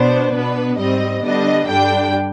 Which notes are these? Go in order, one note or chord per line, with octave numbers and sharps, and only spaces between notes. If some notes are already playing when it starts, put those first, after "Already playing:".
Already playing: B2 B3 D4 C5
B2 B3 D4 B4
G#2 G3 C4 D#5
D3 G3 B3 D4 D#5
G2 D3 G3 D4 G5